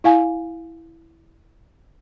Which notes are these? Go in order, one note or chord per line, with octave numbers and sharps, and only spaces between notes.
E4 F5 G#5